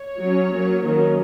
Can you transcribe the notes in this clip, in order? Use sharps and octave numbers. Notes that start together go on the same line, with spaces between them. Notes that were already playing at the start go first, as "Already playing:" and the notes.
Already playing: C#5
F#3 C#4
F#3 A#3 C#4
D#3 F#3 A#3 C#4